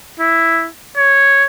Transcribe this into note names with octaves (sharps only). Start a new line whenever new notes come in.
E4
C#5